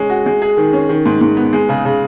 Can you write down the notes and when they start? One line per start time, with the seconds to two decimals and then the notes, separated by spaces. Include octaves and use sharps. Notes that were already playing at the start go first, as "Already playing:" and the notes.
Already playing: G#3 C#4 C#5
0.10 F#4
0.26 G#3
0.42 G#4
0.57 D#3
0.73 C#4
0.89 D#3
1.06 G#2
1.21 G#2
1.37 B3
1.53 G#3
1.69 C#3
1.85 C#3